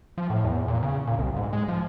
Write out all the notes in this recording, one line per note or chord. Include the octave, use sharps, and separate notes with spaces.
F3
A2
E2
A#2
C#3
A#2
C2
G#2
G#3
F3